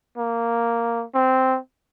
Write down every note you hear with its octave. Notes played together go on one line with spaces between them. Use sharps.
A#3
C4